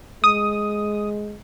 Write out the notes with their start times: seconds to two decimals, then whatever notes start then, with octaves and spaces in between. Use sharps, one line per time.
0.24 G#3 D#6